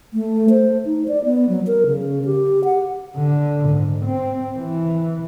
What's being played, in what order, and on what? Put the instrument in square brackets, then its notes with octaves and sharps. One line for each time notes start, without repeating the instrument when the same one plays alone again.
[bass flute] A3
C5
D#4
D5
B3
F#3
A#4
C#3
G4
F#5
[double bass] D3
G#2
C4
E3